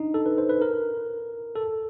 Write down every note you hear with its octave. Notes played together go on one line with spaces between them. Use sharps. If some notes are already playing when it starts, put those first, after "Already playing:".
Already playing: D4 D#4
A4
B4
C5
B4
A#4
A4